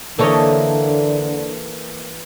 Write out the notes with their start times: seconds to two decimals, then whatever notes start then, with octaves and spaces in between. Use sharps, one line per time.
0.19 D3 E3 A#3 A4 C#5 D#5